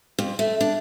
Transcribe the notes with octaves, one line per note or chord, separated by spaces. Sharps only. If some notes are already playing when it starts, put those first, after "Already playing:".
F2
A3
D4